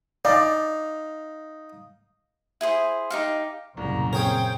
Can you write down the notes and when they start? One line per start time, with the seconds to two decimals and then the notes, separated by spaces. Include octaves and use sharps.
0.25 D#4 D5 F5
2.61 E4 G#4 C5
3.10 D#4 G4 F5
3.77 C2 F#2 A#2 C#3 A#5
4.13 C4 G#4 A#4 C#5 G5